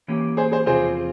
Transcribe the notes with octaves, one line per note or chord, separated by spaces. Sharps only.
E3 A#3 C#4 G4
G#4 C5
G#4 C5
E2 C3 F3 C4 F4 G#4 C5